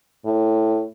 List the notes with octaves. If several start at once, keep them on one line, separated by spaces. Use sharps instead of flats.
A2